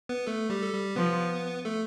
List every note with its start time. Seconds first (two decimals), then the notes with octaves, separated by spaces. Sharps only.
0.09 B3 B4
0.27 A3 A4
0.50 G3 G4
0.62 A4
0.73 G3 G4
0.96 F3 B3 B4
1.65 A3 A4